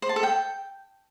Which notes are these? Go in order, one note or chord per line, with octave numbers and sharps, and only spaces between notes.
C5
A5
A4
G5